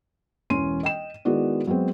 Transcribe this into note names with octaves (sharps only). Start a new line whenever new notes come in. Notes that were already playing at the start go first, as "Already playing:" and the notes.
E1 E3 C#4 C6 D#7
D#5 G5 E7
D#3 G#3 B3 E4 F#4 D5
F#3 G#3 B3 C4